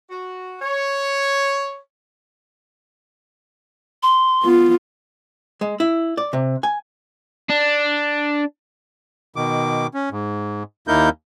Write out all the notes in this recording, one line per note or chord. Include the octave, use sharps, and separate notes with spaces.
F#4
C#5
C6
B3 F4
G#3
E4
D5
C3
G#5
D4
B2 D#3 D6
C#4
G#2
D#2 A#3 D#4 E4 A#4 G6